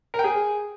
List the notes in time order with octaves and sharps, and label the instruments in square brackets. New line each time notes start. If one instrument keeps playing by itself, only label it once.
[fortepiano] A#4
G5
G#4